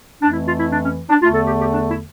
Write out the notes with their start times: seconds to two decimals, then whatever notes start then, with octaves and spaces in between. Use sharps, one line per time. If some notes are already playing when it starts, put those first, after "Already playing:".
0.21 F2 E3 A3 D4
0.32 E4
0.46 F4
0.58 E4
0.72 D4
0.84 C#4
1.10 D4
1.21 E2 D3 A3 F4
1.34 A4
1.47 G4
1.60 G4
1.72 D4
1.89 E4